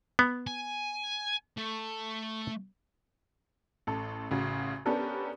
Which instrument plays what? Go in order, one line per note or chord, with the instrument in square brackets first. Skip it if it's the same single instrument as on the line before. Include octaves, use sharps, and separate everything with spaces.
[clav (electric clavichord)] B3
[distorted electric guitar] G#5
A3
[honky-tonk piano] A1 A4
A1 C#3 F#4
B3 C#4 D4 G4 A4 A#4